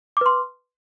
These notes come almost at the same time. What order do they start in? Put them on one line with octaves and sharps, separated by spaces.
D6 B4 C6